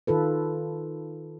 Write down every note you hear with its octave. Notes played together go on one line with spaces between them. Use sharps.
D#3 F4 A4 B4